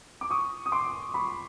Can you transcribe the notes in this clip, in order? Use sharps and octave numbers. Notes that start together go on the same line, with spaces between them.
D6
C#6 D#6
D#6
C6 D6
B5 C#6